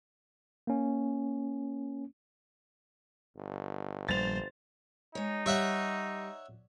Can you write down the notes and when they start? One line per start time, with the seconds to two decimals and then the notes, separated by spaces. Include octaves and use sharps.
0.67 A#3 C#4
3.37 G1
4.09 A#1 G3 C5 A6 F7
5.15 G#3 D#4 C#5
5.46 G3 C#5 E5 F#5